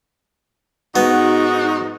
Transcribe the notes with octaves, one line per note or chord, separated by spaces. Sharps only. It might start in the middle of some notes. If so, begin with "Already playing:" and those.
G#2 B3 D#4 F#4